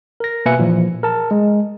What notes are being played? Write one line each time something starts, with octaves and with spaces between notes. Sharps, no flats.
A#4 A#6
B2 A#3 B4 E5 G#5 C#7
A#2 E3 F3
A#4 A5
G#3